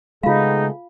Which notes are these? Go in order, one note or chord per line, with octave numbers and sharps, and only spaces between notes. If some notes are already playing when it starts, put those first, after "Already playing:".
C#3 G#3 A3 B3 D#4 F4 G#4 F5